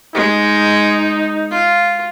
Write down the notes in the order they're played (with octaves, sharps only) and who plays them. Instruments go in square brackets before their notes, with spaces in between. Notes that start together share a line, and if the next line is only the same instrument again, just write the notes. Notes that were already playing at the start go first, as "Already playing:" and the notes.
[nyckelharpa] G#3 [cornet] D#4
[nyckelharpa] F4